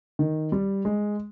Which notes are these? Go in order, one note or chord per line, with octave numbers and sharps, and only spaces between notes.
D#3
G3
G#3